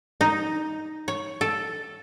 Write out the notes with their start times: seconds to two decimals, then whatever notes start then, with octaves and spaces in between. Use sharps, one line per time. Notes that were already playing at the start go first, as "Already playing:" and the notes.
0.21 D#4
1.08 C#5
1.41 A4